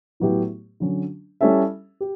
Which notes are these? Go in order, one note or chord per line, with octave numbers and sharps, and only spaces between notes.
A2 F#3 B3 E4 G4
D3 F#3 C#4
G3 C#4 E4 A4 E5
G4